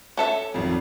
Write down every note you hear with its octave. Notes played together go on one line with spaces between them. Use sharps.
C#4 A4 E5
G#1 F2